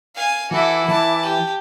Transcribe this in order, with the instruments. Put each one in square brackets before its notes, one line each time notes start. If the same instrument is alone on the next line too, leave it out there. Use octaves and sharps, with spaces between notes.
[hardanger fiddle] F5 G#5
[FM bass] E3 [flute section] E4 D6 [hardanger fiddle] F#4 A4
[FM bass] E3 [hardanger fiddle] A5
[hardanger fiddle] G4